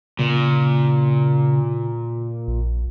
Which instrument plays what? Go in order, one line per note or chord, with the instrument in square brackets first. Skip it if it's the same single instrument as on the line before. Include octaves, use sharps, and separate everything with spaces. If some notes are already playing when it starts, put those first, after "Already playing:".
[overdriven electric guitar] A#2 [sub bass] C#3
[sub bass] A#1